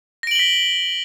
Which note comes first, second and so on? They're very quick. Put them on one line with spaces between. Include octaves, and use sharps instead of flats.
A#6 D7 F#7 G7 B6